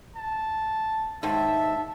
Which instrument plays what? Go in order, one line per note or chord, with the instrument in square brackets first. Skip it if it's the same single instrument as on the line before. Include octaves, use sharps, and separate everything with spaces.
[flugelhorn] A5
[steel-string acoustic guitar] D#2 G#2 [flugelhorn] E5 [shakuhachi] A5